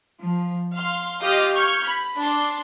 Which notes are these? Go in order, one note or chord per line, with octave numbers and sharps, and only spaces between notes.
F3
F5 C6
F4 G4 D#5 F5
C#6 F6 G6 G#6
B5
D4 C6